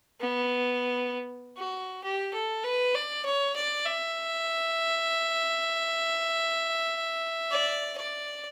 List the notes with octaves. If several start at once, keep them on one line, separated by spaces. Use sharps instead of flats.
B3
F#4
G4
A4
B4
D5
C#5
D5
E5
D5
D5